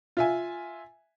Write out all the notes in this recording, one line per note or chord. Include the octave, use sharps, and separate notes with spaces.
F4 E5 G#5